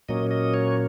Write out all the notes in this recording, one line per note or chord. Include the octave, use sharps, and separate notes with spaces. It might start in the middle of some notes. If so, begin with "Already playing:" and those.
A#2 F#3 A#3 C#4 D#5
D#5
C#5